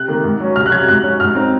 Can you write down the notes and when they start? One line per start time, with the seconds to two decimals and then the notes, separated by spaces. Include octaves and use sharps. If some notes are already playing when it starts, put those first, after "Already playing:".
Already playing: C3 F#6
0.08 D#3 A#3
0.24 G#2
0.40 F#3 C#4
0.56 C2 F6
0.66 F#6
0.72 C3 F#3 G#6
0.88 G#2 F#6
1.04 F#3 C#4
1.20 G#2 F6
1.35 F#3 C4 D#4